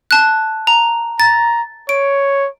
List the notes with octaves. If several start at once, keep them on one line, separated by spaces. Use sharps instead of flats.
A5 F#6
A#5
A#5 A6
C#5 D7